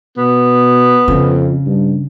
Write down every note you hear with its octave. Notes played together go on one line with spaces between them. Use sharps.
B2 B3
F2 C#3
G2